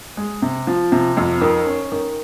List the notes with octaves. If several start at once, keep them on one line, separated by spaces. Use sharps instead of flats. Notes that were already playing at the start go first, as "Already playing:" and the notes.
G#3
C3
F3
C3
F2
D#3
C#4
D#3